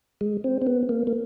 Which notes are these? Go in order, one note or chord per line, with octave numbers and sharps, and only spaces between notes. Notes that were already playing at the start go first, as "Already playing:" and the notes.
G#3
C4
C4
B3
A#3
A#3